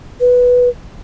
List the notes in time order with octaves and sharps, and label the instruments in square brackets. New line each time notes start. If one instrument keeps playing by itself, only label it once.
[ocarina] B4